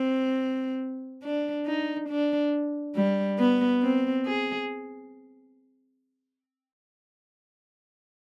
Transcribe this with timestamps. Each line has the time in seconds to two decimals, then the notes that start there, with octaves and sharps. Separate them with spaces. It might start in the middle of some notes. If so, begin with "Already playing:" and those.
Already playing: C4
1.23 D4
1.67 D#4
2.09 D4
2.96 G3
3.39 B3
3.82 C4
4.26 G#4